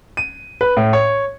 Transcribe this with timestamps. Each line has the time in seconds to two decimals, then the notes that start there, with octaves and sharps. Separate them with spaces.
0.17 D#7
0.61 B4
0.77 A2
0.93 C#5